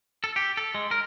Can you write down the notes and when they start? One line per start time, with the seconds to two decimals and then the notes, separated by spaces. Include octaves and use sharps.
0.24 A4
0.36 G4
0.57 A4
0.75 G#3
0.91 A#4